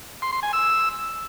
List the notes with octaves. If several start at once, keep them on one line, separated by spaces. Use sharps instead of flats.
C6
C6
G#5
E6